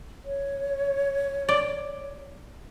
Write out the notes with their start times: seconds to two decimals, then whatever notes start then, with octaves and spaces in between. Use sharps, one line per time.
0.25 C#5
1.49 D5